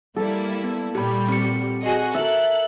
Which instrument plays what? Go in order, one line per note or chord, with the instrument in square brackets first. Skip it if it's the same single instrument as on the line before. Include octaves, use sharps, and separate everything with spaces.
[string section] G3 A#3 E4 [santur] A4 D5
[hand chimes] B3
[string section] A#2 G3 [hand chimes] G4 B5
[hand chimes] C4 C#7
[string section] F#4 G#4 D#5
[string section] A4 F#6 [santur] A#4 E5